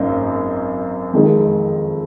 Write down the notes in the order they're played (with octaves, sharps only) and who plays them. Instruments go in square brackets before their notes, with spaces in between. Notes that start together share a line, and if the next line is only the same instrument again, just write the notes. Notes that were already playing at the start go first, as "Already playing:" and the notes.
Already playing: [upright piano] G#1 F#2 A#3 D#4
F2 D#3 G#3